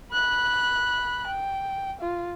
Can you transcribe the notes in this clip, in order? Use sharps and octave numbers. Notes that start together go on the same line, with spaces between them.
B5 F#6
G5
F4